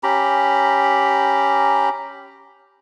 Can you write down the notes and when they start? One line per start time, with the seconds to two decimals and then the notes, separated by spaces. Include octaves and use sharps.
0.03 C#4 G4 A#5 B5